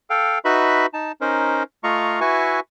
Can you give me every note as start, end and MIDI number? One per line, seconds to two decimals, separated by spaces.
0.10 0.39 69
0.10 0.39 77
0.10 0.39 79
0.45 0.86 63
0.45 0.86 66
0.45 0.86 71
0.45 0.86 76
0.45 0.86 83
0.94 1.12 63
0.94 1.12 81
1.21 1.63 61
1.21 1.63 63
1.21 1.63 70
1.21 1.63 72
1.84 2.20 57
1.84 2.20 65
1.84 2.20 75
1.84 2.20 77
1.84 2.20 82
1.84 2.20 85
2.21 2.60 64
2.21 2.60 66
2.21 2.60 71
2.21 2.60 76
2.21 2.60 80
2.21 2.60 85